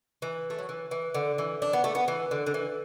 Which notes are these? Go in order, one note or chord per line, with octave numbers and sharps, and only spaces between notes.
E3
A3
F#3
E3
E3
D3
E3
D4
B3
A3
B3
E3
D3
D3
E3